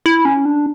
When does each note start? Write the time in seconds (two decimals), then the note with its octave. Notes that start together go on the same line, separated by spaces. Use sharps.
0.06 E4
0.25 C#4
0.45 D4